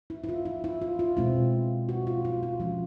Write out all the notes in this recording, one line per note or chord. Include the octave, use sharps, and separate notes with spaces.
E4
E4
F4
E4
E4
F4
F4
B2 G#3 C4 E4
F#4
F4
F4
F4
F3 G#3 C#4 E4 F4